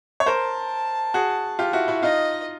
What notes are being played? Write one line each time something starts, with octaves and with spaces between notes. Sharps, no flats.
C#5
A#4 C5 A5
F#4 G#4
F4 G4
E4 F#4
E4 F#4
D#4 F4 D#5